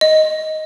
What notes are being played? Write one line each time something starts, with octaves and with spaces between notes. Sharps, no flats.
D#5